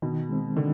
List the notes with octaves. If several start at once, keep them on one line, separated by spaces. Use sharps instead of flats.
B2 D#3
G#3 C4
D3 D#3